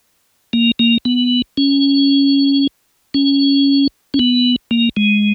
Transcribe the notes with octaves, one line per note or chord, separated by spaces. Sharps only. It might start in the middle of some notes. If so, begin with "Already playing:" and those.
A#3
A#3
B3
C#4
C#4
C#4
B3
A#3
G#3